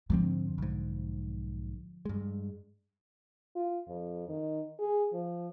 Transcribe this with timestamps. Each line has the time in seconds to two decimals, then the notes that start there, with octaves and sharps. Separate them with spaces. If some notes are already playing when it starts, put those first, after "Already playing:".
0.10 F2 G#2 D3 F3 C4
0.58 B1 G#2
2.05 G2 G#3
3.56 F4
3.88 F2
4.29 D#3
4.80 G#4
5.13 F3